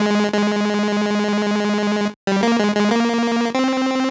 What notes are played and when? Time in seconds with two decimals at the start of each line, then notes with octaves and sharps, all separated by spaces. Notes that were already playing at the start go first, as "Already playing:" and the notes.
Already playing: G#3
0.34 G#3
2.27 G3
2.43 A#3
2.59 G#3
2.75 G#3
2.91 A#3
3.55 C4